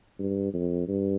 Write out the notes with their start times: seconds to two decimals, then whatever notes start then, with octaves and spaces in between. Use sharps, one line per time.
0.19 G2
0.53 F2
0.88 G2